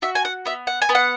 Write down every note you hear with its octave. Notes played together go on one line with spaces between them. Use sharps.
F#4 E5
G#5
F#5
B3 E5
F#5
G#5
B3
F#5